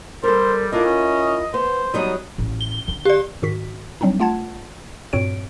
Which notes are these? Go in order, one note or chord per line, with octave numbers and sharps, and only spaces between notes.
G3 A4 A#4 C5
D4 E4 F4 A#4 D#5
C#4
B3 C5
F#3 G3 B3 D#4 D#6
A1
G7
D3
G4 D5
G#2 D#3 F#4 B6
F#3 G3 C4 D4 D#4
A3 F4 F#5 A5 G#6
G2 A#2 C4 F#4 C#5 D7